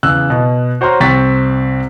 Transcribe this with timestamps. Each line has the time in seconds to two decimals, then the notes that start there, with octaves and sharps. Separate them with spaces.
0.03 E2 C#3 E6 F#6
0.30 B2
0.81 F#4 C5 C#5 A#5 C6 F6
1.00 C2 C4 C5 C#6 A6 B6